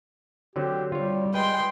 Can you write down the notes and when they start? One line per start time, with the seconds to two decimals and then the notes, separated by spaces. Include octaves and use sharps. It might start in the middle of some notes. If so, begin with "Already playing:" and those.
0.56 D3 F#3 C4 G4
0.92 G3 F4 C#5
1.34 G#3 B4 G5 C6